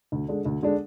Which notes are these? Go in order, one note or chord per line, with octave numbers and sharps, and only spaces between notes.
D2
D3 G#3 D4
D2
D3 G#3 D4